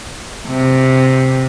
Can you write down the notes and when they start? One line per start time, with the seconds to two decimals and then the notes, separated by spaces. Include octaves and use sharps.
0.48 C3